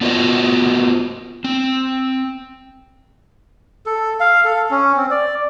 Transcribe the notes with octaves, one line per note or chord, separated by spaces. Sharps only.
B3 D4 F4 F#4 C5 D#5
C4
A4
F5
A4
C#4
C4
D5